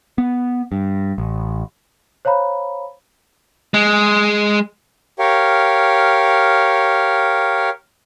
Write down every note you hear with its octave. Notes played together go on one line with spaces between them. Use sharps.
B3
G2
A1
C5 C#5 F5 A#5 B5
G#3
G4 A#4 C#5 F5